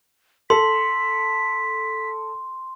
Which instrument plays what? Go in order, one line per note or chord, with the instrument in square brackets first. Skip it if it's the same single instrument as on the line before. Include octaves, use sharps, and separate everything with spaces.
[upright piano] A4 [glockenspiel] C6 [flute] B6